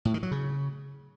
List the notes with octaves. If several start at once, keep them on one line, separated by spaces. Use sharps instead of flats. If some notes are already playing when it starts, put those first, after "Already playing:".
A2
D#3
F#3
C#3